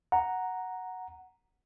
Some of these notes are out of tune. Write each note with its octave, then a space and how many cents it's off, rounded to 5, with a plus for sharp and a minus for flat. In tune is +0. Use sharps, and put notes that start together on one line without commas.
F#5 +0 A#5 +0